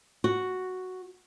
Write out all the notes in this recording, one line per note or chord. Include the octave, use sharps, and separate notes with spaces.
F#4